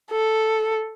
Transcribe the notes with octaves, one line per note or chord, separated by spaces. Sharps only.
A4